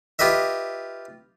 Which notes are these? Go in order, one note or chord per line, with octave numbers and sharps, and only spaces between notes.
F4 G4 B4 D#5 E5